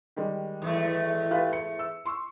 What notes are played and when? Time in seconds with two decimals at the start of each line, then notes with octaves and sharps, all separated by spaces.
0.16 D#3 G3 G#3
0.62 E2 G#2 A3
1.31 F4 G4 B4
1.53 C#7
1.79 E6
2.06 C6 C#6 E6